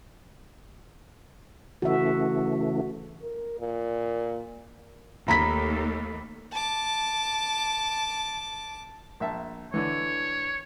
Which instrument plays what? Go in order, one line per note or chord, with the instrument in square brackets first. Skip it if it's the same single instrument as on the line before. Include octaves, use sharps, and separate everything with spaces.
[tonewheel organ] C#3 E3 A3 [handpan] F#4 E5
[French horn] A#4
A#2
[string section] D#2 A3 [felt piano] A#5 B5 B6
[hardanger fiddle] A5 D6
[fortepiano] A#1 E5 A5
[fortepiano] D3 E3 [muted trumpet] C#5